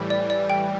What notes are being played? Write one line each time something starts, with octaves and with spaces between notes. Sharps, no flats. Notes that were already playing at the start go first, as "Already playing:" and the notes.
Already playing: A2 E3 G3
D5
D5
G5